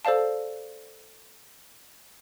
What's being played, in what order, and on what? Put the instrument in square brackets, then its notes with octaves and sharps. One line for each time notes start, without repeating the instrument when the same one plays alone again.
[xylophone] A4 C5 D5 F5 A5